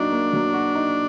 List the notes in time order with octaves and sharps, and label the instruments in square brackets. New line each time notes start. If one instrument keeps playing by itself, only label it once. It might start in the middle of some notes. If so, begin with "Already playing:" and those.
Already playing: [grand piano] F#3 A#3 D#4 F#4 [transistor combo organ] D4
[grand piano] A#3
F#3
F#4
D#4